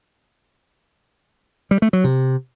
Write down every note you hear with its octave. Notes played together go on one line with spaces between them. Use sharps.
G3
A3
F#3
C3